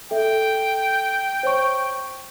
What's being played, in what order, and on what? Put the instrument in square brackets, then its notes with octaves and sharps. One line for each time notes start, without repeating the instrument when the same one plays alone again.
[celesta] A4 E5 [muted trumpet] G5
[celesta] C5 C#5 C#6